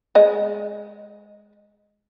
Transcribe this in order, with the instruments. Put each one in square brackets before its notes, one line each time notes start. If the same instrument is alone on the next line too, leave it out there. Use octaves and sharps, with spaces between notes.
[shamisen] G#3 D#5